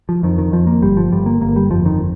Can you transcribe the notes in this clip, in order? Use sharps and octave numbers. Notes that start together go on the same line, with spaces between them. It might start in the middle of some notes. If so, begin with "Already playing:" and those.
F3
F2 D#3
D#3
F2 F3
A#3
G1 G3
F3
G1 G3
A#3
G1 A#3
G3
F2 F3
D#3